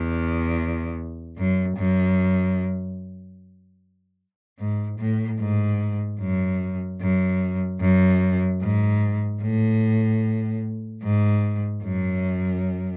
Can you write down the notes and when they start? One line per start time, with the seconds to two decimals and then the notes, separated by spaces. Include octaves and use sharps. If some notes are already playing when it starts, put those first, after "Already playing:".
Already playing: E2
1.37 F#2
1.77 F#2
4.59 G#2
4.99 A2
5.39 G#2
6.20 F#2
7.01 F#2
7.81 F#2
8.61 G#2
9.41 A2
11.03 G#2
11.83 F#2